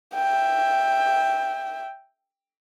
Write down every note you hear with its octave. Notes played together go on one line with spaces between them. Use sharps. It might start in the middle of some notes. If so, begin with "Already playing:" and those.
E5 G5